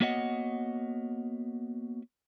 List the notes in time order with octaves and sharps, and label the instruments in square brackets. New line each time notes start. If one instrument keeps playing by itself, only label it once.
[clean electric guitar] A#3 B3 F#4 C#5 D#5 F#5